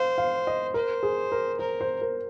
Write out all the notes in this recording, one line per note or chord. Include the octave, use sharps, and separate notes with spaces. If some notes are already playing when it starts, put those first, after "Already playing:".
Already playing: C5 F5
F5
D#5
A#4 C5
G#4
A#4
A#4 C5
C5
A#4